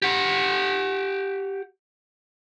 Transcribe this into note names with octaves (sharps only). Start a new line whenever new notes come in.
G4 F#5